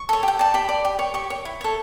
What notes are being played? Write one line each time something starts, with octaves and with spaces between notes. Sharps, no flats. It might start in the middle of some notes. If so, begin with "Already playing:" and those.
Already playing: C#6
A4 C#5
G4 G5
D5 A5
G4 B5
D5
G4
C#5
G4 C#6
C#5
E4
A4 C#5